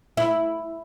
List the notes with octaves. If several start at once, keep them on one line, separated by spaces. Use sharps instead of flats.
E4